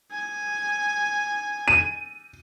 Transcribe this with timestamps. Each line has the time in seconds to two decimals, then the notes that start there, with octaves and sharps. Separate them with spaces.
0.12 G#5
1.68 D#7